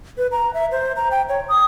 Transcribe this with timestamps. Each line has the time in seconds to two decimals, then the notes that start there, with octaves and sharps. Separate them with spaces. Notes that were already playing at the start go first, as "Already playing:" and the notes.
0.18 B4
0.32 A#5
0.54 E5
0.71 C5
0.96 A#5
1.11 G5
1.29 C#5
1.49 D#6